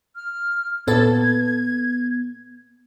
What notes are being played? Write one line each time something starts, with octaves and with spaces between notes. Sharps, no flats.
F6
A#2 B3 A4 G#6 A6